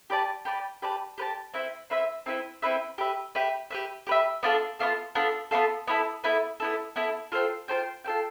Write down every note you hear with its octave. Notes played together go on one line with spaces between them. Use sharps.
G4 B4 D5 A5
G4 B4 D5 A5
G4 B4 D5 A5
G4 B4 D5 A5
C4 E4 B4 E5
C4 E4 B4 E5
C4 E4 B4 E5
C4 E4 B4 E5
G4 B4 E5
G4 B4 E5
G4 B4 E5
G4 B4 E5
B3 D4 F4 A4
B3 D4 F4 A4
B3 D4 F4 A4
B3 D4 F4 A4
B3 E4 A4
B3 E4 A4
B3 E4 A4
B3 E4 A4
F4 A4 C5 G5
F4 A4 C5 G5
F4 A4 C5 G5